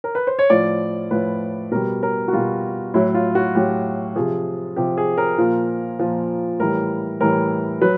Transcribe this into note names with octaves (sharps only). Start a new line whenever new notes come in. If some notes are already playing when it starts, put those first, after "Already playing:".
A#4
B4
C5
C#5
A2 F3 D5
A2 F3 B4
B2 G3 A#4
A#4
F#4
B2 G3 F4
A2 F#3 E4
F4
F#4
A2 F#3 G4
C3 F3 G#4
C3 F3 G4
G#4
A#4
A#2 F3
A#2 F3
A2 E3 G3 A#4
A2 E3 G3 A#4
F#3 B4